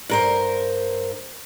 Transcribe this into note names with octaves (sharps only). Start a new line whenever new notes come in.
G2 A#4 C5